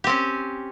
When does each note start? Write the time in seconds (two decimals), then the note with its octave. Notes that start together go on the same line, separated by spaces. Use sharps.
0.04 G4
0.07 C4
0.09 C#4